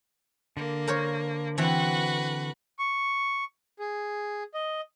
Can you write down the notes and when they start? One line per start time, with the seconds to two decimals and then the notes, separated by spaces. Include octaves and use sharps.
0.57 D3 A#3
0.87 A#4 C5 C#5
1.58 E3 C4 F#4 B4
2.79 C#6
3.79 G#4
4.54 D#5